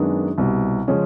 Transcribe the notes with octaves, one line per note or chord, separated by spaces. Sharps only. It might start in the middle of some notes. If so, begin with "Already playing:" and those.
Already playing: F#2 D#3 G#3 B3 D4
C2 B2 G3
C#3 F3 G#3 C#4